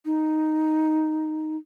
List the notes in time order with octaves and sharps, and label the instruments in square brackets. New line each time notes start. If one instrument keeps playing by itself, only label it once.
[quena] D#4